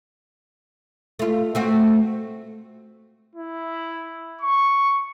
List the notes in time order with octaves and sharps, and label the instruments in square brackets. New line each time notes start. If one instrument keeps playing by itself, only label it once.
[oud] A3 F4
A3 C4 F#4
[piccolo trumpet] E4
C#6